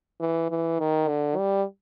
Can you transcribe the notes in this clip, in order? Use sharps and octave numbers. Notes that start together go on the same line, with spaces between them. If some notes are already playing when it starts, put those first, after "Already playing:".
E3
E3
D#3
D3
G3